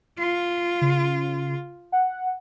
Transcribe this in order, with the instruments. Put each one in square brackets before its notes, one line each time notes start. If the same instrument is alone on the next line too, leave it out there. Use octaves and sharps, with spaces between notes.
[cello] F4
[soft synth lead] C#3
F#5